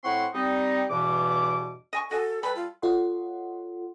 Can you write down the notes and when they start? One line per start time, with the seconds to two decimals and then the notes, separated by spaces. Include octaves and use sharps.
0.04 A2 C4 E4 F#5 C6 C#6
0.34 G3 C4 D#4
0.90 E2 G2 B2 E3 D6
1.93 D#5 G#5 C#6
2.11 F#4 A4 D#5 G#5
2.43 G3 A4 B4 B5
2.56 F4
2.82 F4 A4 C#5 D#5 F#5 C6